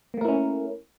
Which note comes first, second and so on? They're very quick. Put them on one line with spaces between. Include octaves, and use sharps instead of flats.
A#3 A3 A#4 E4 C#4